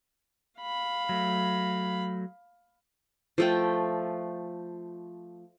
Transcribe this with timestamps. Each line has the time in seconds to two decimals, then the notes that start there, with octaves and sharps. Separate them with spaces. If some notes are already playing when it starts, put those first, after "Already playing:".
0.61 F5 B5
1.09 F#3 A3
3.38 F3 A3 G5